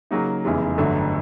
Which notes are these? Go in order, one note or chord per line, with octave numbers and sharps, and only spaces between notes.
C#3 F#3 A#3 D#4
F1 E2 C#3 E3 G#3
G1 F2 D3 F#3 A3